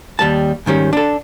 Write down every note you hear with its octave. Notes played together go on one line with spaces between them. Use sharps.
D#2 G3 A5
G#2 D#3 G3 C#4
D4 A4